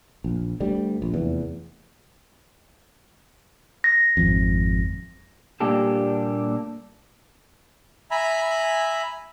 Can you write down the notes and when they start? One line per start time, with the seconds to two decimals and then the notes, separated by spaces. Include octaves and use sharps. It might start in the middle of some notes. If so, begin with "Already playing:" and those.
0.24 A#1
0.60 D2 G3
1.02 A#1
1.13 F1 E2
3.84 A#6
4.17 G#1 F2
5.60 A#2 G3 A#3 D4 G4 A4
8.11 E5 G#5 A#5 B5